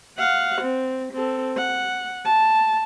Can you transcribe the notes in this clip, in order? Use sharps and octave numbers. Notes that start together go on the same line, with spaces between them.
F5 F#5
C4
C4 A4
F#5
A5